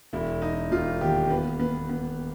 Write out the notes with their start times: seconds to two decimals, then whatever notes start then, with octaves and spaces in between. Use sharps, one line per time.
0.13 E1 E4
0.42 E1 D#4
0.71 E1 F4
1.01 D#2 G4
1.30 B3
1.59 B3
1.89 B3